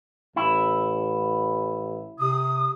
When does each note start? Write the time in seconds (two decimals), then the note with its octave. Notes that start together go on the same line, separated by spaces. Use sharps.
0.36 A1 E4
2.19 C3 D#6